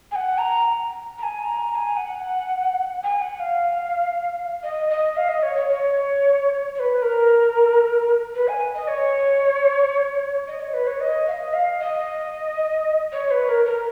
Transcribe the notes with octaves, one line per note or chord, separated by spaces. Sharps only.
G#5
F#5
A#5
A#5
G#5
A#5
A#5
G#5
F#5
G#5
F#5
F5
D#5
D#5
F5
D#5
C#5
C#5
C#5
C#5
B4
A#4
B4
G#5
D#5
C#5
D#5
C#5
B4
C#5
D#5
F5
D#5
F5
D#5
C#5
B4
A#4
A#4